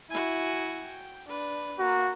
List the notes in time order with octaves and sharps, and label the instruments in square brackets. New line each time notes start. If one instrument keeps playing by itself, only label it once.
[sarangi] E4 [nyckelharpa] F#4 G#5
[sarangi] G5
[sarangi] D4 [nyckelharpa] B4
[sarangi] A#3 [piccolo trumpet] F#4